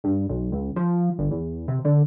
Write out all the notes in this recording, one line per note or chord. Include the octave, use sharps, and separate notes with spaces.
G2
B1
C#2
F3
G1
E2
C3
D3